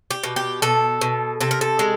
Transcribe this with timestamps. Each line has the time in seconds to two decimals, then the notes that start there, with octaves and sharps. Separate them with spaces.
0.11 G4
0.24 B2
0.36 G4
0.62 B2 A4
1.01 B2
1.41 C3 A4
1.51 A#4
1.61 A4
1.79 G#3